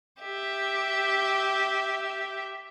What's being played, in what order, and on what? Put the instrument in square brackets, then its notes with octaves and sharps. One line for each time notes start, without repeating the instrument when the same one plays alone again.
[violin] G4 E5